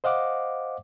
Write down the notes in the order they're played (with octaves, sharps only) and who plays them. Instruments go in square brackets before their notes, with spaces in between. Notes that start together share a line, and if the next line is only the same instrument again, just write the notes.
[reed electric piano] C5 D#5 F5 F#5 D6